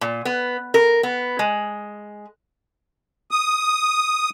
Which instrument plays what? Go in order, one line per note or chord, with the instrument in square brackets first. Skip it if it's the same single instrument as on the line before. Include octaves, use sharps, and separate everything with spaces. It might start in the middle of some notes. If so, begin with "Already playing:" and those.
[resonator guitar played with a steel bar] A#2
B3
A#4
B3
G#3
[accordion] D#6